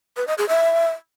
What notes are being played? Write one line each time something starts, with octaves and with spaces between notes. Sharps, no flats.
B4
D#5
G#4
E5